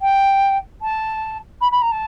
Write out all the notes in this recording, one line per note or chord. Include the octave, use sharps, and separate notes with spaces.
G5
A5
B5
B5
A#5
A5